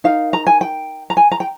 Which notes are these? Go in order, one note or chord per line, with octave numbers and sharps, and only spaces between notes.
D#4 A#4 F5
A#5
G#5
G5
A#5
G#5
A#5
G5